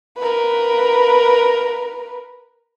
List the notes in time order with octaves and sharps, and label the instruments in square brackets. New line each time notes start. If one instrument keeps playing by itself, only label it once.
[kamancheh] A#4 B4